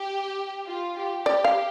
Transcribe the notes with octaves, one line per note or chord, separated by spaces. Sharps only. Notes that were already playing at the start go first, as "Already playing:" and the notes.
Already playing: G4
F4
G4
G4 D5
F5